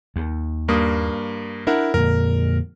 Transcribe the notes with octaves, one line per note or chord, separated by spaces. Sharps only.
D#2
G2 A#3 D#6
D4 E4 A#4 F#5
F2 A#2 D3 A#4